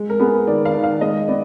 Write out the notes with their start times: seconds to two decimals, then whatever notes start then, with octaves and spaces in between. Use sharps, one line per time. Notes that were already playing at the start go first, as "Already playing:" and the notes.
Already playing: G#3
0.10 A#4
0.20 B3 G#4
0.47 D#3 D5
0.65 F5
0.74 D#3
0.83 F5
1.01 G#3 D#5
1.28 B3 D5